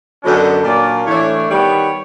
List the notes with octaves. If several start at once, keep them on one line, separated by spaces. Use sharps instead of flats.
F#2 D3 F#3 B3 D4 D#5
A#2 F#3 A#3 D4 D5
A2 E3 A3 D4 C#5
D#3 G3 B3 C#5